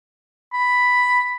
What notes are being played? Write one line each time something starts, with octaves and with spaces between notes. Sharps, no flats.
B5